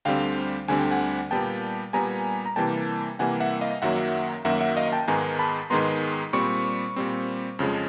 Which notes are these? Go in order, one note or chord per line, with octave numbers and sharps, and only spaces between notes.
D2 D3 G3 C4 F5 G5
D2 D3 G3 C4 G#5
G5
F#5 G#5
A#2 G3 B3 G5 A5
A#2 G3 B3 G#5 A#5
A#5
C3 E3 G3 A#3 G5 A5
C3 E3 G3 A#3 F#5 G#5
E5 F#5
D#5 F5
F#2 D#3 F#3 A#3 E5 F#5
F#2 D#3 F#3 A#3 E5 F#5
E5 F#5
D#5 F5
G5 A5
G#2 D#3 G#3 B3 G#5 A#5
A5 B5
G#2 D#3 G#3 B3 A#5 C6
A#2 G3 C4 B5 C#6
A#2 G3 C4
F2 C#3 F3 G#3